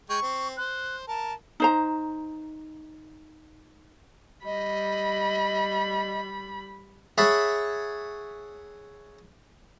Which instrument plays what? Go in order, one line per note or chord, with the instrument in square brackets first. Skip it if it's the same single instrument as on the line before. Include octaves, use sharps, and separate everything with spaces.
[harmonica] G#3 G5 [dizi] C#6
[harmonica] C4
[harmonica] C5 [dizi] F#6
[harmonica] A#4 [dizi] A5
[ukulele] D#4 C5 A#5
[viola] G3 B5 [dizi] D#5
[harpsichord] G#4 C#5 E5 F#5 A5 B5